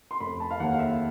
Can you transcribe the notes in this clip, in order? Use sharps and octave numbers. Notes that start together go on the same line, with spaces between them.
C6
F1 B5
A5
F5
D#2 F#5
F5
E5